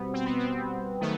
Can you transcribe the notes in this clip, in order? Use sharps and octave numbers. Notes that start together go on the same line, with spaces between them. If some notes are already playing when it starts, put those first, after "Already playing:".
Already playing: B2 G3 B3 C4
C4
B3
C4
D#3 F#3 A3 B3